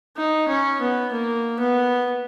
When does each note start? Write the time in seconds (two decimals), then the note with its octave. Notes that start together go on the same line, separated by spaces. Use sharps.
0.17 D#4
0.49 C#4
0.81 B3
1.12 A#3
1.60 B3